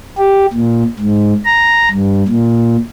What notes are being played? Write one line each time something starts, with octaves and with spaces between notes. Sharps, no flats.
G4
A#2
G#2
A#5
G2
A#2